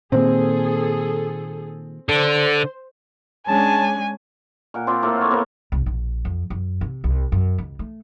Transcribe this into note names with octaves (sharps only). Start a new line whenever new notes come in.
A#2 D#3 A#3 C4 G#4 A4
D3 C5
G#3 C#4 D4 G#5 A5
A#2 A#4 F#5
C4 F4 D5 B5
A2 A#3 F4 A4
C#5 F#5
A#3 B3 C5 C#5
C2
A#1
F2
F#2
C3
C2
F#2
C#2
A3